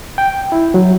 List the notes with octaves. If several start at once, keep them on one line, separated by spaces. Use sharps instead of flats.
G5
E4
F#3